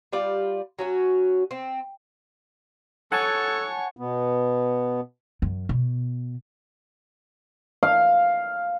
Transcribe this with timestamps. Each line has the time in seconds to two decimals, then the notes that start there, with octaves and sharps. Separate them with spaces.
0.13 G3 F4 D5
0.79 F#3 C#4 F#4
1.51 C4
3.12 A4 C#5 F#5 G#5 A5 C#6
3.97 B2 B3
5.42 F#2
5.69 B2
7.83 F5